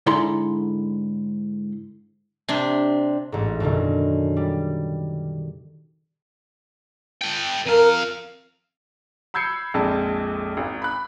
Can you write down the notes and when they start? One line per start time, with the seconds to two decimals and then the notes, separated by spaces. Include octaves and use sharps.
0.06 G#2 D3 E4 A4 A#5 C6
2.48 C3 D4
3.32 A1 G#2
3.60 F#2 B2 D3 D#3
4.37 G3
7.22 A4 G5
7.66 F2 A#4 F5
9.34 B5 E6 G6 G#6 C7 C#7
9.74 A#1 F2 G#3 A5
10.57 G#1
10.82 B5 F#6